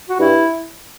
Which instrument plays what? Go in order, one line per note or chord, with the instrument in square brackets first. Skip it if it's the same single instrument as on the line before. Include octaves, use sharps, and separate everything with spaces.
[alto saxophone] F#4
[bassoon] G2 [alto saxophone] E4